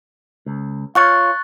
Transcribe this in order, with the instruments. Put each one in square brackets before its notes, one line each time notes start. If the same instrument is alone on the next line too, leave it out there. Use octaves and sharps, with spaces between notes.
[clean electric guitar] C#2
[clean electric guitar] F4 C#5 [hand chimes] C#6 F#6 A6